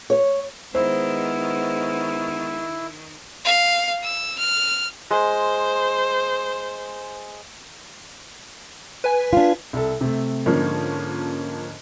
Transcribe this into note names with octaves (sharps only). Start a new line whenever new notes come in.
C#5
D#3 G#3 B3 E4 C5
F5
E6
F6
G#3 C5
B4 G#5
D4 F4
C2 A4
C3 A3
G#2 D3 F3 A#3 C#4